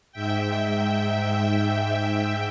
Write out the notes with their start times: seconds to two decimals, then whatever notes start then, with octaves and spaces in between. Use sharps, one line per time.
0.12 G#2 E5 G5